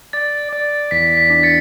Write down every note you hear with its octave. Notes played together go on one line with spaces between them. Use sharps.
D5 A6
D5
E2 B6
B6
D4
A6 C#7